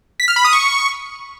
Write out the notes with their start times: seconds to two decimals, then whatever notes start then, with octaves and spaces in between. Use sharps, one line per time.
0.20 B6
0.28 F6
0.36 B5
0.44 D#6
0.53 C#6